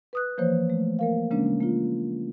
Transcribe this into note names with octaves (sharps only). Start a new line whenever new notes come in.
B4 D#6 F#6
E3 F3 A#3 C5 C#5
A3
A#3 A#4 F5
C#3 G#3 A#3 C#4 D4
A#3 F4